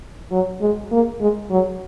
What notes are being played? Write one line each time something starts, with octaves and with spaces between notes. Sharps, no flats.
F#3
G#3
A#3
G#3
F#3